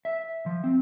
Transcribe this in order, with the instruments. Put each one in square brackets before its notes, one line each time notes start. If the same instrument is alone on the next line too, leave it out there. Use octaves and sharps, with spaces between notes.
[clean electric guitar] E5
F3
C4